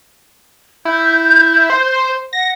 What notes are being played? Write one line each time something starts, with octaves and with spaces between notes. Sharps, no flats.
E4 G6
C5
F#5 A#6